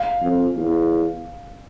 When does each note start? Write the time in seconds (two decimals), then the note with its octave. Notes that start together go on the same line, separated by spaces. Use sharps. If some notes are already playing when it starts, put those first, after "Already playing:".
Already playing: F5
0.22 F2
0.56 E2